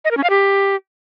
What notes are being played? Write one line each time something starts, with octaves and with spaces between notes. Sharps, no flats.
D#5
A#4
C#4
F5
G4